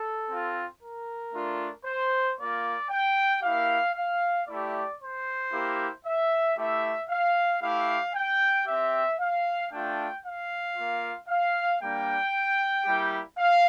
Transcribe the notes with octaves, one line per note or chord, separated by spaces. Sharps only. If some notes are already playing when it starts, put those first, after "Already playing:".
Already playing: A4
C4 F4
A#4
A3 D4 F4
C5
A#3 F4 D5
G5
A#3 E4 G4 F5
F5
A3 E4 G4 D5
C5
A#3 E4 G4
E5
A3 E4 G4 E5
F5
A3 E4 G4 F5
G5
C4 G4 E5
F5
A3 D4 F4 G5
F5
A#3 F4
F5
G3 A#3 D4 G5
G3 A#3 E4 G4
F5